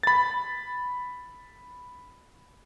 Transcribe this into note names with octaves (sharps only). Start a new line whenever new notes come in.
B5 A6